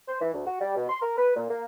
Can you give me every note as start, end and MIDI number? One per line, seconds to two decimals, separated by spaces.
0.08 0.19 72
0.21 0.30 52
0.34 0.46 38
0.46 0.56 66
0.61 0.73 55
0.77 0.88 47
0.90 1.01 84
1.01 1.15 70
1.17 1.33 71
1.36 1.47 46
1.50 1.63 58